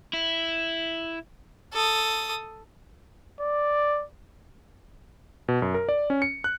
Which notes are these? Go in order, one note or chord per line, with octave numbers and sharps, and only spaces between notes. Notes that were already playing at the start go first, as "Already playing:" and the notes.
E4
A4 D#6
D5
B2
F#2
A#4
D5
C#4
C#7
F#6